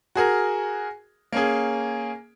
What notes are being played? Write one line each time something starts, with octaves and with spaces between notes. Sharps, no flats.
F#4 G#4 A#4
A#3 C#4 G#4